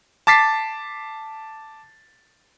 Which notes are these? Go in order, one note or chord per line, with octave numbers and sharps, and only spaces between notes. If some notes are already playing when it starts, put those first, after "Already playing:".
A5 D6 A6 B6 C7